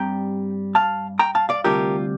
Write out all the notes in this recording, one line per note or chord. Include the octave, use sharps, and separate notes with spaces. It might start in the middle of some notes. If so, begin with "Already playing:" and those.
Already playing: G2 G3 C4 G5 A#5
F5 A5
G5 A#5
F5 A5
D5 F5
D2 C3 G3 D4 F4 G4 A#4